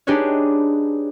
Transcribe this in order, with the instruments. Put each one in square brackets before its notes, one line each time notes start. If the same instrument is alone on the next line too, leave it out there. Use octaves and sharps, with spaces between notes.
[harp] D4 D#4 G4 G#4 B4 C#5